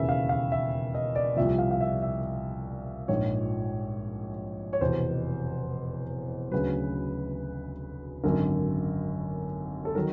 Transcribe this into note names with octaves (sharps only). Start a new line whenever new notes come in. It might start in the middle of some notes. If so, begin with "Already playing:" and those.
Already playing: E1 D#2 C#3 E3 E5
F5
F5
E5
D#5
D5
C2 A#2 F3 E5
F5
F5
E5
E5
A#1 G#2 F3 C#5
C#5
F1 E2 B2 C5
D2 C#3 F#3 B4
G#1 F#2 D3 A#4
A4
D#3 F#3 A#4